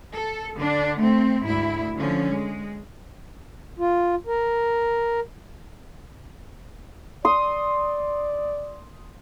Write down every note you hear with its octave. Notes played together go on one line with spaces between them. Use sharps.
A4
D3 D4
A3 C4
D2 G#2 E4
D3 F3 C#4
G#3
F4
A#4
D5 C6 D#6